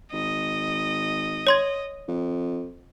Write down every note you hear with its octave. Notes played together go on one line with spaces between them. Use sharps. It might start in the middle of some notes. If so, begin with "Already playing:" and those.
G#1 D#5
C#5 C6 G#6
F2